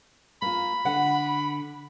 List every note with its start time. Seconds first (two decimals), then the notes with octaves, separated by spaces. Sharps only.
0.42 A#3 F4 B5
0.85 D3 F#5